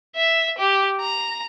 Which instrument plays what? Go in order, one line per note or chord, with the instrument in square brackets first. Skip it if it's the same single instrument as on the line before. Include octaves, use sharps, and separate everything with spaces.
[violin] E5
G4
A#5